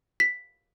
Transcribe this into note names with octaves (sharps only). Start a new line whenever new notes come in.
B6